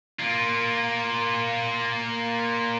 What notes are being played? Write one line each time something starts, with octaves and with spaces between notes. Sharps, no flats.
A#3 F4